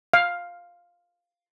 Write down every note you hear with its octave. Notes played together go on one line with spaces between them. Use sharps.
F5